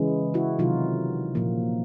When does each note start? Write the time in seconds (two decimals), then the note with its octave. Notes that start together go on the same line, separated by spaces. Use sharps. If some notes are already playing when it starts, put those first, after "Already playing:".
Already playing: C#3 E3 G#3
0.34 E4 F#4
0.59 C3 D#3 F#3 D#4 F4
1.35 A#2 F3 A#3